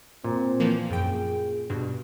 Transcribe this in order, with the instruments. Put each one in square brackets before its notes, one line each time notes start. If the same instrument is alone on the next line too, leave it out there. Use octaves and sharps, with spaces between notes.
[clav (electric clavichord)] A#2 [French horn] C4
[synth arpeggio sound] E3 F3 A#3
[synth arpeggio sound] F#2 G5 [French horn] G#4
[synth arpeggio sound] G2 B2 [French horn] G3